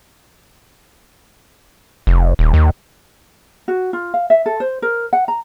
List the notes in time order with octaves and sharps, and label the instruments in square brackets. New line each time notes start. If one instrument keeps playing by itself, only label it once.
[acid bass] F1
D#1
D#2
[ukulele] F#4
F4
F5
E5
A4
C5
A#4
F#5
A#5